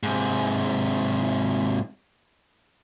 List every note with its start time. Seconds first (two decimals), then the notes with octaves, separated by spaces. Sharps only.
0.03 G#2 C3